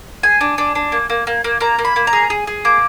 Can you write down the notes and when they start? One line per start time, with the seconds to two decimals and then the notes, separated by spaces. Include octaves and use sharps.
0.23 G#4 G#5
0.41 D4
0.58 D4
0.75 D4
0.92 A#3
1.10 A#3
1.27 A#3
1.44 A#3
1.61 A#3 A#5
1.79 A#3
1.85 B5
1.96 A#3
2.07 A#5
2.13 G#4
2.30 G#4
2.47 G#4
2.65 A#3 D6